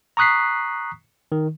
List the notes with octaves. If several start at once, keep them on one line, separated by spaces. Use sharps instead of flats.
A#5 C#6 D#6 F#6 B6 C7
D#3